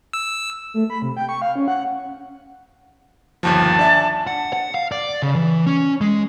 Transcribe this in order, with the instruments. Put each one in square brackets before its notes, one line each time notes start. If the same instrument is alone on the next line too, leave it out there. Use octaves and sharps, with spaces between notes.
[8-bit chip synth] E6
[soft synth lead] A3
B5
C3
G5
C#6
F5
C#4
F#5
[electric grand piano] G1 D#2 F3 [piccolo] A5
[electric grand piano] D4 E5 G#5
[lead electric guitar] F#5
F#5
F5
D5
C#3
E3
C#4
G#3